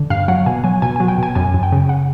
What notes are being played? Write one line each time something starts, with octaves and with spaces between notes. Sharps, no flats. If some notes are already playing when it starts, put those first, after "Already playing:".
Already playing: D3
G2 F5
F#3 F#5
B2 G#5
F#3 G#5
B2 G#5
F#3 G#5
G5
B2 G#5
F#2 G#5
F#2
G5
C#3
F#5